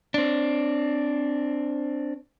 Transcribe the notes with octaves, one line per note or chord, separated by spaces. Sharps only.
C4 D4